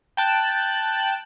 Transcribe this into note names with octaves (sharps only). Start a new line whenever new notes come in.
G5 A5 F#6